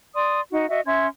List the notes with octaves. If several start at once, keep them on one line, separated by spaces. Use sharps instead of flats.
D5 C6 D#6
D#4 F#4
F#4 D#5 E5
C#4 E5 C6 G#6